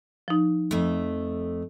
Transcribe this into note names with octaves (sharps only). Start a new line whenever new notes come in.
F3 D#4
F2 A3